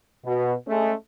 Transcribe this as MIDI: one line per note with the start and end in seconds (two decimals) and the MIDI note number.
0.25 0.53 47
0.67 0.92 56
0.67 0.92 57
0.67 0.92 61